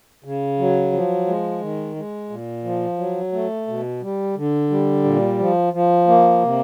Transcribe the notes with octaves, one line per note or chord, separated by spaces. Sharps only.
C#3
F#3
F3
G#3
D#3
G#3
A#2
F3
F#3
A3
B2
G3
D3
G3
A#2
F3
F3
A#3
C3